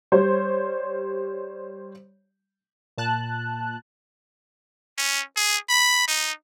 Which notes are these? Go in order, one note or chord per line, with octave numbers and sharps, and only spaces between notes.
G3 C5 C#5
A#2 A5 F#6
C#4
G#4
B5
D#4